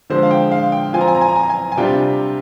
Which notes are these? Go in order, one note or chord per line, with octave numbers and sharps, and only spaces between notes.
D3 F3 G#3 C5
F5
G5
F5
G5
F3 C4 F4 G#5
A#5
G#5
A#5
G#5
A#5
G#5
A#5
G#5
G#5
C3 G3 D4 F4 G5